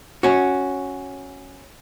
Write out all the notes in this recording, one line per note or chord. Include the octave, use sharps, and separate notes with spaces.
C#4 F#4